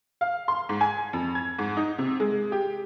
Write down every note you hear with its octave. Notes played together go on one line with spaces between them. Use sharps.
F5
C6
G#2
G#5
F2
G#6
G#2
D#4
C3
G#3
G4